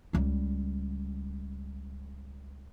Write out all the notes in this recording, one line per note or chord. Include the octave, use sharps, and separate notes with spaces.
C#2 G3